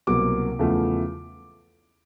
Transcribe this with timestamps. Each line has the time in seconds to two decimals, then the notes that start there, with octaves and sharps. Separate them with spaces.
0.07 C2 B2 F#3 A#3 D6
0.59 E2 C#3 F3 A3